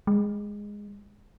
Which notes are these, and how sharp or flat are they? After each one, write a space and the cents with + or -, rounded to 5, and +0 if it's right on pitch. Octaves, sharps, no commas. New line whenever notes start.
G#3 -10